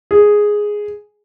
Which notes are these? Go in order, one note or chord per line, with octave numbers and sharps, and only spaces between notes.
G#4